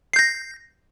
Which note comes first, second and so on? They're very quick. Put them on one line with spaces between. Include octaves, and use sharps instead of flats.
C7 G6 A#6